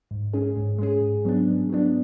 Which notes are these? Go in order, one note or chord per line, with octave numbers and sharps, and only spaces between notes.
G#2
G#3 C#4 G#4
G#2
G#3 C#4 G#4
G#2
F#3 B3 D4
G#2
F#3 B3 D4